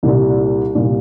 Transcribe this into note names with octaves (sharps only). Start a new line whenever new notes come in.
C2 A#2 G3 D4
C2 A#2 G3 D4